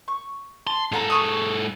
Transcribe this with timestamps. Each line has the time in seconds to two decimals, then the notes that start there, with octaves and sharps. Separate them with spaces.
0.08 C#6
0.67 A5 C6
0.92 G#2 A4 F5 F#5 A#5
1.10 G#4 C#6 D#6